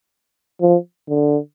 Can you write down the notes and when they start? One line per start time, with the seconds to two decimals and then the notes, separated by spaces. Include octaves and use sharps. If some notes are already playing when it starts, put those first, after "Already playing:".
0.61 F3
1.09 D3